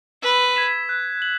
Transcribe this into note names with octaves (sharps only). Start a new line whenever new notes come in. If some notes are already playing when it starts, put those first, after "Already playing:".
B4 E6
G#6 B6 E7
F#6
F#7